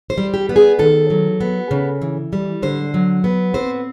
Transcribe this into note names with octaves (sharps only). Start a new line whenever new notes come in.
C5
G3
G4
B3
G#4
D#3 A4
F#3
B3
C#3
E3
G3
D3 C5
F#3
B3
C4 C5